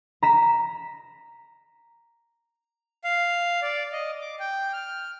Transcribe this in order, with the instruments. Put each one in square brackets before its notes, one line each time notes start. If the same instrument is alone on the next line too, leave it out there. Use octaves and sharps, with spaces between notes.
[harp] A#5 B6 E7
[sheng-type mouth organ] F5
D5
D#5
D6
G5
F6